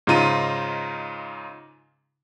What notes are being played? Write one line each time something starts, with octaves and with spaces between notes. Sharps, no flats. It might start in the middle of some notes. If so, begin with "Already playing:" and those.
G#2 C#3 D#4 F4 A#5 D#7